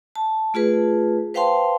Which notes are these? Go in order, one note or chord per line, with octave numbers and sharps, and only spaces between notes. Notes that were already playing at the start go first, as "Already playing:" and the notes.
A5
A3 F4 G#4 B4
B4 C5 F5 G5 A5 C6